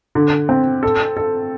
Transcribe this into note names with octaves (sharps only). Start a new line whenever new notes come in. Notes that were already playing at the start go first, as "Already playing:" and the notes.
D3
C4
A4
A4